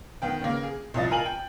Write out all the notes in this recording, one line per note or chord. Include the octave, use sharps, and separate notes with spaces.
D#3 B3 G5
C#3 A#3
G#4
C2 E3 F3 D#5 A6
F4 A#4 G#5 F#7
G5